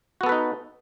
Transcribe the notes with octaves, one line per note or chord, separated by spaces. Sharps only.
B3 D#4 F#4 A4 B4